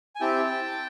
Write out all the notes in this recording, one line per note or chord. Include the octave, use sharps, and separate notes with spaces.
G#5
C4 E4 G4 G5 A5